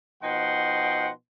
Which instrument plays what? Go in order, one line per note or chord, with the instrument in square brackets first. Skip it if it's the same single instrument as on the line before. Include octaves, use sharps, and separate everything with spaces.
[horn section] B2 F3 D#4 F#5 G5 C6